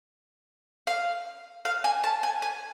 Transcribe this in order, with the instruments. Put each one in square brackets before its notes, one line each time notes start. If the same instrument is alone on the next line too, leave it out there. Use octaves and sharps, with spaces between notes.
[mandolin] F5
F5
G#5
A5
G#5
G#5